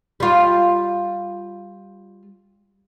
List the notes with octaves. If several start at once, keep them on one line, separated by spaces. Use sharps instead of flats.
G3 F4